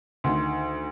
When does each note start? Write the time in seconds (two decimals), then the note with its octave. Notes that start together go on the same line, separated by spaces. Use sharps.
0.24 D2 D#3 C6